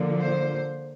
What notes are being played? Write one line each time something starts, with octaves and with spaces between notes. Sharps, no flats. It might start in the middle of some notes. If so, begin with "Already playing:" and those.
Already playing: D3 F3 A#3
C5